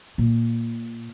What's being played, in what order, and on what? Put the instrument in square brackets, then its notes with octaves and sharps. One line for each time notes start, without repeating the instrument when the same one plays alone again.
[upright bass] A#2